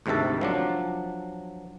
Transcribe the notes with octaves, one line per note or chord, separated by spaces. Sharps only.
D2 G#2 C3 D#3 E5 A5
F3 F#3 D4